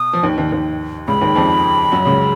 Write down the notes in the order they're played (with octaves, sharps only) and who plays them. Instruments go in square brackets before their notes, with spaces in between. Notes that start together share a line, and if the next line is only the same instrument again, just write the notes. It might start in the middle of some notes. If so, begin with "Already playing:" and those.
Already playing: [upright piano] B2 [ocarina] D#6
[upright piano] F3
D#2 D#3
D#2 D#3
D#2 D#3
[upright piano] C#2 C#3 [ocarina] B5
[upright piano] D#2 D#3
F2 F3
F#2 F#3
C#2 C#3